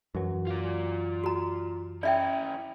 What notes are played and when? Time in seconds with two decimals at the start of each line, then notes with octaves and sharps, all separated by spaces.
0.15 F#2 E3 F#3
0.47 F4 D5
1.24 F#4 A#5
2.03 C#4 E4 D5 E5 G5